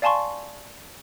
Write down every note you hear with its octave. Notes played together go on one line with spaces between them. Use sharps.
D5 F5 G#5 A5 C6 C#6